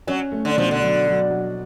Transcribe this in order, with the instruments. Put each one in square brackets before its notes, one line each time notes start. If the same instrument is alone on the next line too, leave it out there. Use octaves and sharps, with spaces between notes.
[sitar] F#3 [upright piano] C#4
[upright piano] A3
[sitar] D3
[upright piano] B2 [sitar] F3
[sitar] D3
[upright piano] F#3
F#3
F#3